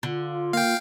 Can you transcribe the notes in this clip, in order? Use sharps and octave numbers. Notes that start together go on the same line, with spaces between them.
D3 F4
A#3 F5 G5